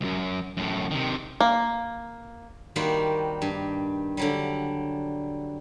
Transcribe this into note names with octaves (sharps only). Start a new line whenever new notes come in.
C2 F#2
F#2 A2
C3 D#3
A#3
D#3 G3 A#3 F#4 C5
G2
D3 F#3 G3